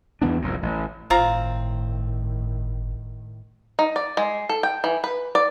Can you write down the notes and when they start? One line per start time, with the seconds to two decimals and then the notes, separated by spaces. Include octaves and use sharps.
0.22 E2 E3 B3 D4
0.42 F1 C2 G2 A#2
0.63 A1
1.10 G1 A2 D#3 C4 F4 A#5
3.79 D#4
3.96 D5
4.17 G#3
4.49 A4
4.63 G5
4.84 E3
5.04 B4
5.35 D5